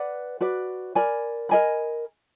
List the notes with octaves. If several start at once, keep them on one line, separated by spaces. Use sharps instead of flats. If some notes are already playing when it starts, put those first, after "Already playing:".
Already playing: B4 D5 F#5
F#4 B4 D5
A#4 D5 G#5 B5
A#4 D#5 G#5 B5